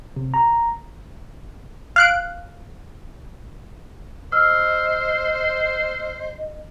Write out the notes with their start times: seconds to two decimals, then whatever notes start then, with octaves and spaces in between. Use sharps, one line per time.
0.16 C3
0.34 A#5
1.96 F5 F#6 D7
4.32 C5 D#5 E6 F6